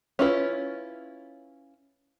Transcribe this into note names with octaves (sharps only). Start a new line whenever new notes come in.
C#4 E4 F4 B4